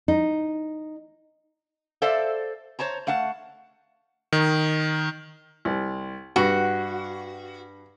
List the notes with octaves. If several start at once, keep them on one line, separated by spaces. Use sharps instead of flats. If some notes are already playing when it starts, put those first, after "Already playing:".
D#4
A4 C5 D5 E5 F5 A5
C5 C#5 A5 A#5
A3 F5 F#5 A5
D#3
C2
G2 F#4